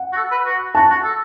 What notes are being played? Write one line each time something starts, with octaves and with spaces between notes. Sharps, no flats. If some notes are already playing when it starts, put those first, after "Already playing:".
Already playing: F#5
F#4
A4
B4
F#4
F#4 A5
F#4
A4